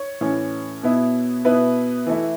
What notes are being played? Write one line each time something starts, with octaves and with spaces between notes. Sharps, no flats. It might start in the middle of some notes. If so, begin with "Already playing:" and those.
Already playing: C#5
A2 E3 C#4
B2 B3 E4
B2 B3 E4 B4
E3 A3 E4